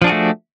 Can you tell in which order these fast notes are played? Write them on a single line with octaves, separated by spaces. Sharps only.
F3 D4 G#4 F#4 A3